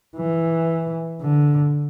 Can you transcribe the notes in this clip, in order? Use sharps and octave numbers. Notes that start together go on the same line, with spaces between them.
E3
D3